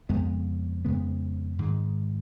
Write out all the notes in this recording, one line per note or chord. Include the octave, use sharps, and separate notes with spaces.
F2 C#3 G#3 B3
F2 C#3 G#3 B3
G#2 D#3 G#3